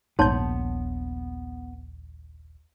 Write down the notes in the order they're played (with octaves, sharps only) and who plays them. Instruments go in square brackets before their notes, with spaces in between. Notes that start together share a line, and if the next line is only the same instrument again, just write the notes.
[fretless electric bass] D#1 A#1 [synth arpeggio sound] G#2 G6 [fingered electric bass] B3 [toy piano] C#5 A5 C6